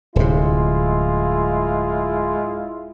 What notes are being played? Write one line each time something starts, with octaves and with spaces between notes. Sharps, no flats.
D1 C3 G#3 E4 F4